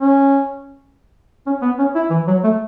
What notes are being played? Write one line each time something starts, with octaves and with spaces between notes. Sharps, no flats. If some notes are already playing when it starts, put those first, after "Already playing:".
C#4
C#4
B3
C#4
E4
E3
F#3
A3